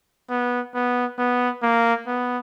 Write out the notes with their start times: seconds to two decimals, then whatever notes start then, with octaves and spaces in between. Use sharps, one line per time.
0.30 B3
0.74 B3
1.18 B3
1.63 A#3
2.07 B3